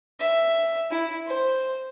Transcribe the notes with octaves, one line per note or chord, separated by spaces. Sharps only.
E5
E4
C5